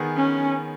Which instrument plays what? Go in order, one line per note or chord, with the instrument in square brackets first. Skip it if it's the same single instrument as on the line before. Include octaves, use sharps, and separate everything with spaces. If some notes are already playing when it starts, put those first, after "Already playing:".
Already playing: [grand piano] D#3 B3 G#4
[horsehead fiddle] C#4